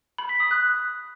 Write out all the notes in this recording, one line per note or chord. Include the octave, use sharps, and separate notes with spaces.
B5
B6
D#6
F#6